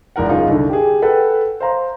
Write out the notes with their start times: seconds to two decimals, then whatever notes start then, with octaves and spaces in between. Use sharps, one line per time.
0.16 E1 E3 A#4 F#5
0.29 F#2 C#3 D#4 F4
0.48 C2 D3
0.69 G4 G#4
1.02 A4 B4 F#5 G5
1.60 C5 F5 A#5 C6